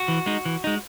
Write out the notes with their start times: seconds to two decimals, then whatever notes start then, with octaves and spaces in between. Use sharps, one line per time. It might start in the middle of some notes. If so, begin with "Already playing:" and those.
Already playing: F#4
0.08 E3
0.26 G#3 D#4
0.45 E3
0.64 G#3 D#4